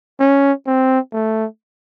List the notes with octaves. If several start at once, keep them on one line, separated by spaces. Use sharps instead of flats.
C#4
C4
A3